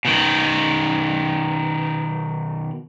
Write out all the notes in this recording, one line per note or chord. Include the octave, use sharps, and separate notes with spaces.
B2 D#3